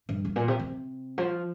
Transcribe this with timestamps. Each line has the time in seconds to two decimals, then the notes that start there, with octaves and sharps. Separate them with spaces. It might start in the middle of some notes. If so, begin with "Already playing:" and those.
0.09 G2
0.25 G2
0.36 A#2
0.48 C3
0.60 C3
1.18 F3